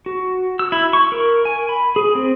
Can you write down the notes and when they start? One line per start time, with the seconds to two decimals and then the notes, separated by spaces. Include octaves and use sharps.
0.06 F#4
0.59 E6
0.72 E4
0.93 C#6
1.12 A#4
1.45 G#5
1.69 B5
1.96 G#4
2.15 C4